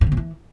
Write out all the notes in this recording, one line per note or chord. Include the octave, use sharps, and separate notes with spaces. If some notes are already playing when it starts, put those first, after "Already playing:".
G2
D3
A#2
E3